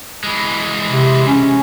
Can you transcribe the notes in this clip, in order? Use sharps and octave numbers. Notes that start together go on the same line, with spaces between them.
E3 G#3
C3
C#4